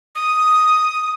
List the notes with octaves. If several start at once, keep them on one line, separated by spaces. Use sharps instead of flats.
D#6